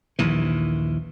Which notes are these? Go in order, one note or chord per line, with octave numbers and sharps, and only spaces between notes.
A#1 D#2 E3